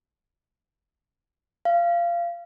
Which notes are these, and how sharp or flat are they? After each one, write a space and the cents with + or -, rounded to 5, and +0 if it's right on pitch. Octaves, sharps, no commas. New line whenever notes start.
F5 -20